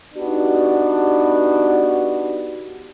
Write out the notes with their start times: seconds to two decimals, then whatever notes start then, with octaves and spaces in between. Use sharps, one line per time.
0.15 B3 D4 D#4 F#4 G4